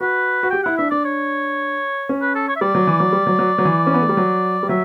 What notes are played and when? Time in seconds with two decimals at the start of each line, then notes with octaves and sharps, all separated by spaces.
0.01 F#4 B4
0.43 F#4
0.50 G4 G5
0.63 E4 F#5
0.77 D4 E5
0.91 D4 D5
1.05 C#5
2.09 C#4
2.21 B4
2.35 A4
2.48 C#5
2.56 E5
2.61 G3 D5
2.75 F#3
2.87 E3
3.00 F#3
3.13 G3
3.27 F#3
3.39 F#3
3.58 F#3
3.65 E3
3.87 C#4
3.94 B3
4.02 A3
4.09 G3
4.17 F#3
4.63 G3
4.69 F#3 E5